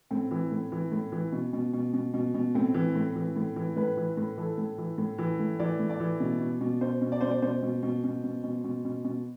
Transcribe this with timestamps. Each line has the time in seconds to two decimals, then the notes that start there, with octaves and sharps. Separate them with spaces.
0.11 A2 C4
0.31 E3
0.51 A2
0.72 E3
0.92 A2
1.12 E3
1.32 B2
1.53 B2
1.73 B2
1.94 B2
2.14 B2
2.34 B2
2.55 A2 C4
2.74 E3
2.95 A2
3.15 E3
3.36 A2
3.56 E3
3.76 A2 B4
3.97 E3
4.17 A2
4.37 E3 A4
4.58 A2
4.78 E3
4.98 A2
5.18 E3
5.39 A2
5.59 E3 D5
5.80 A2
5.90 D5
6.00 E3
6.20 B2
6.41 B2
6.61 B2
6.81 B2 C5
7.02 B2
7.12 D5
7.21 B2 C5
7.30 D5
7.42 B2 C5
7.63 B2
7.83 B2
8.04 B2
8.24 B2
8.44 B2
8.64 B2
8.85 B2
9.05 B2